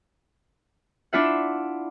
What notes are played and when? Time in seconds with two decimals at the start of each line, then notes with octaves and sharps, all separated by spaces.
1.13 D4 E4 F4 E5 F#5